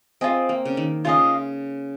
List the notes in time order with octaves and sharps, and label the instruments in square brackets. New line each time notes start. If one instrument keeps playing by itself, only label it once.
[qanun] C4 [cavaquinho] F4 G#4 D#5
[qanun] A#3
C#3
D#3
[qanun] C#3 [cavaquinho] F4 G#4 D#5